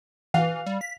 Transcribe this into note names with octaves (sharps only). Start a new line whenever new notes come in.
E3 F5
G3
B6